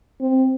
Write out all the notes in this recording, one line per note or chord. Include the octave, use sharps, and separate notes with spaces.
C4